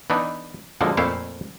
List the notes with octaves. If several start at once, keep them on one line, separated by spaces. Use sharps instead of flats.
E3 B3 D4 D#4
F#2 D3 F3 G#3 A#3
F2 A#2 A3 E4 C5 F5